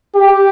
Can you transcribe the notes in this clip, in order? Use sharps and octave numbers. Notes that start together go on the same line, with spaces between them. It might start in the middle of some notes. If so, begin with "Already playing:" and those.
G4